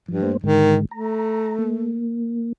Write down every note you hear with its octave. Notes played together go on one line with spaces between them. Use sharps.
G2 F3
A3 A#3 C5
G#2 D3 D#3 G#3
A3 A#5
A#3